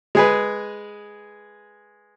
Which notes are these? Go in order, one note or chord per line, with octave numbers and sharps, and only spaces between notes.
G#3 G#4 B4